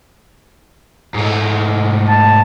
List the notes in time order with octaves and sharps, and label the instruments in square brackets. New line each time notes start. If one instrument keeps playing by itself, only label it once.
[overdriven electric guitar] G#2 A3
[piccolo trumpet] A5